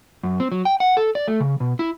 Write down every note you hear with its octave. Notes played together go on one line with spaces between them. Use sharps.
F#2
C4
F#3
G5
F#5
A4
D5
A3
C#3
B2
E4